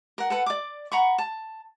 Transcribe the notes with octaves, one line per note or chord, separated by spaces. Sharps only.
A#4 F#5
A4 B4 F#5
D5 D6
F#5 A#5 B5 C#6
A5